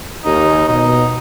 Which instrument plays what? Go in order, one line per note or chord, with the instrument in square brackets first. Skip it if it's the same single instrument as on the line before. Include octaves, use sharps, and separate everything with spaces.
[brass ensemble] D#2 [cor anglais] D#4
[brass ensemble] B2 [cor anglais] D#4